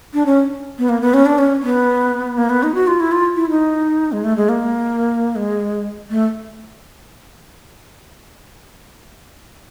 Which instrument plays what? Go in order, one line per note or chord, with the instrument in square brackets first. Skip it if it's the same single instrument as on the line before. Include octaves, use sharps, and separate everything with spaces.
[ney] D4
C#4
B3
A#3
B3
C#4
D4
C#4
B3
A#3
B3
D#4
F#4
F4
E4
F4
E4
D#4
G#3
A3
G#3
A#3
G#3
A3